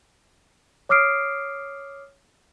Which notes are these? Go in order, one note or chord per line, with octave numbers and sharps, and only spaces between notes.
C#5 D6 D#6 F6 C7 D7